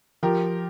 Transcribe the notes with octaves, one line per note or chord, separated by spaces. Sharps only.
F3 G4 A#4